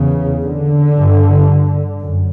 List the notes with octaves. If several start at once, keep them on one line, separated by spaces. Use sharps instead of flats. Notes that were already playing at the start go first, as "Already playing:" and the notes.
Already playing: E2 C#3
D3
G2
F#2